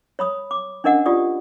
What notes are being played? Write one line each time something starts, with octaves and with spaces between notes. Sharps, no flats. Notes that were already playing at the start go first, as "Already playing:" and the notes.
C#5 B5 D#6
D6
C#4 D4 A#4 D#5 F#5
F4 G4 D5 D#6